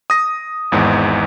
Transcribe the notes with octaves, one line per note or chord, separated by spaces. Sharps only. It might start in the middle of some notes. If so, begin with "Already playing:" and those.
D#6 A#6
G#1 E2 G#2